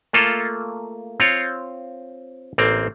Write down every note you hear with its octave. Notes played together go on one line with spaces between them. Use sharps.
A3 A#3 F4 A4
C4 F4 C#5
A1 A#3 C4